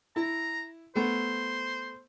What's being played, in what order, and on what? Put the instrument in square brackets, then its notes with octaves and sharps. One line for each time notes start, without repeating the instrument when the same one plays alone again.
[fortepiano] E4 [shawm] A#5
[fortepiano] A3 B3 [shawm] C5